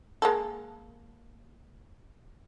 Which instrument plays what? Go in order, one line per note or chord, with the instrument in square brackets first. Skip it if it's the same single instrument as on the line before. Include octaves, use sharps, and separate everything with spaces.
[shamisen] G#3 A#3 A4